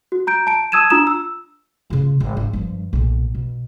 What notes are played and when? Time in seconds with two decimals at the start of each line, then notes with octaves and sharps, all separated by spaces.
0.12 F#4
0.27 A#5 G6 D7
0.47 A5 D7
0.72 A5 D#6 E6 G#6 D#7 E7
0.90 D4 F4 A#5 D#6 E7
1.07 E6
1.90 C#3 F4
2.20 G#1
2.37 D4
2.53 G2 F3
2.93 B1 A#2
3.35 B2